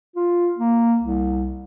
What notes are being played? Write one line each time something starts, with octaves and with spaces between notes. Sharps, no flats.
F4
A#3
C2